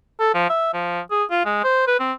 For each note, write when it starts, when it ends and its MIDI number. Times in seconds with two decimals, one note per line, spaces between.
0.20 0.30 69
0.34 0.48 53
0.49 0.73 76
0.73 1.00 53
1.11 1.24 68
1.30 1.45 65
1.45 1.61 56
1.64 1.86 72
1.87 1.97 71
1.99 2.12 60